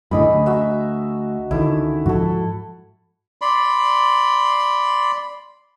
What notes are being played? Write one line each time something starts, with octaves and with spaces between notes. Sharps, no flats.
F#2 A2 D3 G#4 D#5 B5
D2
F#4 E5 A#5
C#2 D3 D#3 E4
G#2 F3 F#4 A4
D5 B5 C6